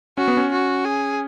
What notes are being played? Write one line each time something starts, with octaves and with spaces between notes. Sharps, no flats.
C#4 F#4
B3
C#4
F#4
G#4